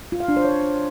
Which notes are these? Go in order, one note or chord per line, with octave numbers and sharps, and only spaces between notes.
F4
F5
D4
C5
C#5